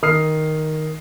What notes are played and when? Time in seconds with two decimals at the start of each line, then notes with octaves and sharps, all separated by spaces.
0.03 D#3 D#6 F6 C7